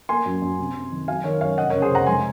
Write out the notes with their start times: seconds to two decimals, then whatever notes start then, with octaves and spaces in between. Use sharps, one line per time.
0.09 A#3 G#5 C6
0.26 F#2
0.42 F#2
0.59 C3
0.75 C3
0.91 D#3
1.08 F#3 F5 G#5
1.24 D#3 A#4 C#5
1.41 F#2 C#5 F5
1.57 F1 D#5 F#5
1.69 C#3 A#4 C#5
1.82 G#4 C5
1.90 F1 F#5 A#5
2.07 G#3 G#5 C6